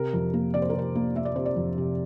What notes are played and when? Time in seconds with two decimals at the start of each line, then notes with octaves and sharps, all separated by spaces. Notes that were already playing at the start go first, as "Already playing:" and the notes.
Already playing: C3 A#4
0.13 F2
0.34 A#3
0.54 C3 D5
0.62 C5
0.70 A#4
0.74 C3 C5
0.95 A#3
1.16 A#3 E5
1.25 D5
1.36 C3 C5
1.46 D5
1.56 F2
1.78 C3